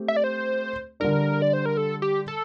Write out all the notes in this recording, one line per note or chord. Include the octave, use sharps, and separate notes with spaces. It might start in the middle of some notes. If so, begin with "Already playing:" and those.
Already playing: A3 C4 G4
E5
D5
C5
D3 G3 D4 A#4
D5
C5
A#4
A4
G4
A4